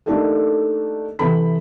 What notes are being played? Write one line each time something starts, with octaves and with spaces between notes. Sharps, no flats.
A3 A#3 D4 D#4 G4 A4
C3 E3 A4 B5 B6